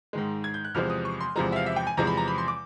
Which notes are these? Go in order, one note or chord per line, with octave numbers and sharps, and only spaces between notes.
G#2 D#3 G#3
G#6
G6
F#6
E2 C3 F3 G#3 F6
D#6
C#6
C6
E2 C3 F3 G#3 A#5
E5
F5
E5
G5
G#5
E2 C3 F3 G#3 A#5
B5
A#5
B5
C6
D6